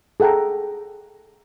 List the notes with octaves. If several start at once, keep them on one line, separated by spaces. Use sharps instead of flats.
G#4 A4 F#5 G5 A#5